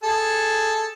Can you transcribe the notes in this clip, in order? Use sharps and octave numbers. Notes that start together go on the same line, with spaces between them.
G#4 A4